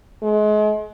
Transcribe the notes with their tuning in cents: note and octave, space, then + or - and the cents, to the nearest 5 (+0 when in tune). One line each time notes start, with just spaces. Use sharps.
G#3 +35